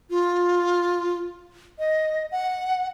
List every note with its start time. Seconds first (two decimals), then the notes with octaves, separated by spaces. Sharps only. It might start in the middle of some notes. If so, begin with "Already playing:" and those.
0.10 F4
1.79 D#5
2.32 F#5